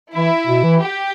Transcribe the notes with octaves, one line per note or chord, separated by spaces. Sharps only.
E3 E4
B2
E3
G4